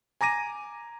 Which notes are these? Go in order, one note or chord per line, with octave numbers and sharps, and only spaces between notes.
G#5 A#5 D6 A#6 D#7